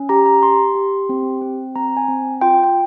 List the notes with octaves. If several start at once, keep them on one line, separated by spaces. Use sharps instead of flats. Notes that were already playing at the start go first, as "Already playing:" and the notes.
Already playing: C#4
G4 A#5
A#5
G4 C6
G4
C4
C4
C4 A#5
G#5
C4
F4 G5
G5